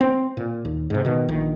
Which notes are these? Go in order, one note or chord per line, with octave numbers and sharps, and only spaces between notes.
C4
A#2
D#2
G#2 C3
B2 D#3
A#1 D#3